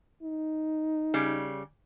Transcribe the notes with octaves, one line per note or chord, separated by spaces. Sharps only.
D#4
C#3 G3